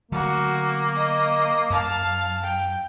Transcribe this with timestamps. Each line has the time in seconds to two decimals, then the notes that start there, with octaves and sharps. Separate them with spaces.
0.12 D3 F#3 A3 A#3 F#4
0.95 D#5
1.70 F#2 F5 A5
2.44 G5